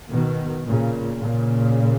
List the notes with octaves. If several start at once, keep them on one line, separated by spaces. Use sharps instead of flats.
B2 D#3
A#2 C#3
A#2 C#3